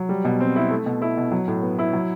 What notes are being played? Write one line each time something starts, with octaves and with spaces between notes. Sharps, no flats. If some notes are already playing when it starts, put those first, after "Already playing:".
Already playing: F#3
G3
B2
C4
E4
A3
B2
E4
B2
F#3
A2
B3
E4
F#3